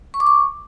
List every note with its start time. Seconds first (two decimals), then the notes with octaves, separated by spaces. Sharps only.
0.14 C#6
0.20 D6
0.27 C#6